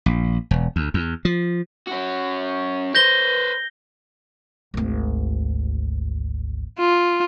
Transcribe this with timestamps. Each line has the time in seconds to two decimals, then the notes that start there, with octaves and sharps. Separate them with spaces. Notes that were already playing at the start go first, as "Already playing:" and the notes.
0.06 A#1
0.51 E1
0.76 D2
0.94 E2
1.25 F3
1.87 C#4 F#4
2.95 B4 C5 G6 A#6 G7
4.74 G#1 D2
6.79 F4